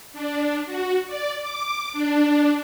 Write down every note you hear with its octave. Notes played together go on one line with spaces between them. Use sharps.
D4
F#4
D5
D6
D4